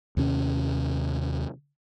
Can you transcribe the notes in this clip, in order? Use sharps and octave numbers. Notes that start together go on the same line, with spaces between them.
D#2 C3 C#4